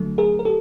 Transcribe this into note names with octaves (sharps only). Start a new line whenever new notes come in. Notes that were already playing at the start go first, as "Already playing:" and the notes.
Already playing: D3 F#3 A3
G#4 A#4
A#4
G4 A4